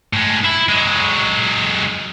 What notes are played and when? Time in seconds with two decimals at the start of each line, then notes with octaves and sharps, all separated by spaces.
0.13 A2 G#3
0.45 E4
0.69 F#3 G#3